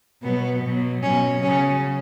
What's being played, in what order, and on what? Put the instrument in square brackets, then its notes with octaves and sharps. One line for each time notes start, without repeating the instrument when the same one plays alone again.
[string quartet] B2 F#3 B3
B2 F#3
B2 F#3 C#4
C#3 F#3 C#4